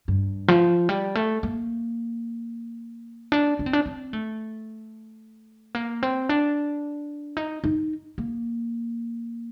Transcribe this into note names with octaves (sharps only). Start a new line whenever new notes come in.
G2
F3
G3
A3
A#3
D4
D4
C4
D4
C4
A3
A#3
C4
D4
D#4
D#4
A#3